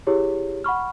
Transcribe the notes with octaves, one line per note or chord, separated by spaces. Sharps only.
E4 G4 G#4 C#5
F#5 B5 C#6 F6